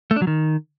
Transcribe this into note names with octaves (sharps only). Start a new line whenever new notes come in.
A3
D4
F#3
D#3